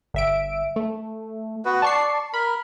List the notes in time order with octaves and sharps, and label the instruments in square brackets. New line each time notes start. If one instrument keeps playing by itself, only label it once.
[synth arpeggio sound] G1 E5 D7
A3
[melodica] B3 F#4 B4
[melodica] D5 [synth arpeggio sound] A5 C#6 C7
[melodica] A#4 [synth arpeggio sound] B5